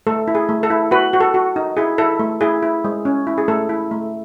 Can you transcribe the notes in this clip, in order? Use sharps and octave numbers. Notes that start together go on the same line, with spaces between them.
A3 A4
E4
G#4
A3
A4
E4
F#4 B4
F#4
A4
F#4
D#4
E4 G#4
E4 A4
A3
E4 G#4
E4
G#3
C#4
E4
G#4
A3 A4
E4
A3